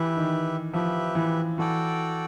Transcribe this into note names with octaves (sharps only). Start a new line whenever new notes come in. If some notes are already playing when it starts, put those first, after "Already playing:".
Already playing: E3 G4 B4 E5
D#3
F3 G4 B4 E5
E3
E3 F#4 A4 D5 G5